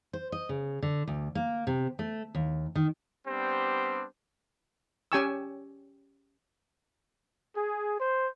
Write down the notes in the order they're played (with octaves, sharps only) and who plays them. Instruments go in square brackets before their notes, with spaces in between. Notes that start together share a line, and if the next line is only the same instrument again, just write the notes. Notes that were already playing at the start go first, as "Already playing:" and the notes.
[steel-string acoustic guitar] C5
D#5
C#3
D3
D2
A#3
C3
A3
D#2
D#3
[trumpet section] G3 B3 C4 D4 G4 C5
[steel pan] C#4 G4 G5 G#5 C#6 E6
[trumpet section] G#4
C5